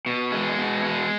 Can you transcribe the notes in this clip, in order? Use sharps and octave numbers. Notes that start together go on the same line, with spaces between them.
B2
G#3
B2
G#3